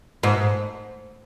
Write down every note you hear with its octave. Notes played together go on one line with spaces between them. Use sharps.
G#2